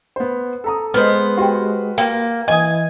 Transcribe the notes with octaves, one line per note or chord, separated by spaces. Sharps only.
B3 C5
A4 A#5 D#6
G#3 B3 C5 D#5 F6
F#4 G4 B4 G5 C6
A#3 G5
E3 D#5 G#5 D#6 G#6